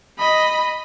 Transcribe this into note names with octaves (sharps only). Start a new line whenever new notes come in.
D#5 B5